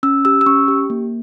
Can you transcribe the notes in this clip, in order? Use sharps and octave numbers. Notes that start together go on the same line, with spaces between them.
C#4 E6
G4 E6
E6
C#4 C#6
G4
A#3